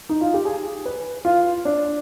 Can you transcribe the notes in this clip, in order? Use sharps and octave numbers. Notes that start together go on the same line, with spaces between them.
D#4
F4
G4
G#4
B4
F4
D4